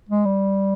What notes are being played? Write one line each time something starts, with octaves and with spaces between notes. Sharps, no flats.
G#3
G3